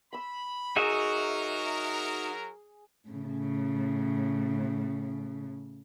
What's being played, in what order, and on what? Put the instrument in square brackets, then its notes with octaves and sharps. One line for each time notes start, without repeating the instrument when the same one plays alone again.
[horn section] B5 [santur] C6 E6
[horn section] F#3 A#4 [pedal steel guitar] D#4 F#4 E5 [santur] G#4
[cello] A2 C#3